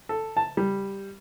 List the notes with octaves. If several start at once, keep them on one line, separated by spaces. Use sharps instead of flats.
A4
A5
G3